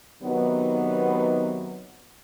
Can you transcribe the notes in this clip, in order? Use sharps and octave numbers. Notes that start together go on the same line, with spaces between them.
C3 D#3 F#3 B3 D#4